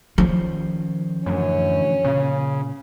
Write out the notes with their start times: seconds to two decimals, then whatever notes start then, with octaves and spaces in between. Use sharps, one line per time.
0.18 D#3 F3 C#4 C5
1.26 F#2 A2 D3 E3 C#4
2.04 A#2 C#3